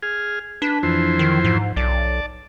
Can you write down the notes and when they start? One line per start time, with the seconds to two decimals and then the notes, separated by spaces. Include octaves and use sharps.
0.03 G#4 F6
0.62 D4 B4
0.83 F2 E3 C5
1.19 D#3
1.44 G#2
1.77 B1 D5 A5